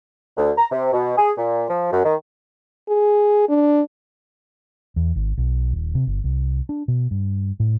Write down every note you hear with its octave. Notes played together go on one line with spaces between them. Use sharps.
D2
A#5
C3
B2
G#4
A#2
F3
F#2
D#3
G#4
D4
E2
G#1
B1
D#1
C3
G1
C2
D4
B2
G2
A2